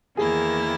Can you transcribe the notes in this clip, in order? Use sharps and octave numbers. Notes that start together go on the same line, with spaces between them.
E2 D#3 A#3 E4 G#4